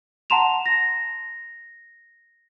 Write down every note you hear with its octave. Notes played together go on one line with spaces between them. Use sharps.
F#5 A5 A#5 C6 E7 F7
A#6